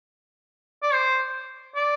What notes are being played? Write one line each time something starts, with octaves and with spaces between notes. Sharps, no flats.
D5
C5
D5